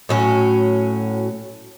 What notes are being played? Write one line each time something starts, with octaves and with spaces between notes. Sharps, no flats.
A2 F#3 C#4